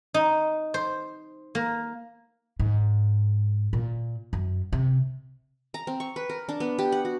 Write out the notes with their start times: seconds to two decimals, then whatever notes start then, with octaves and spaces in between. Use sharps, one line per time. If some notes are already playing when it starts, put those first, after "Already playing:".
0.14 D#4
0.74 C5
1.55 A#3
2.60 G#2
3.73 A#2
4.33 F#2
4.73 C3
5.74 A#5
5.87 C4
6.00 C#6
6.16 B4
6.30 A#4
6.49 D4
6.60 B3
6.79 G4
6.92 F#5
7.05 F#4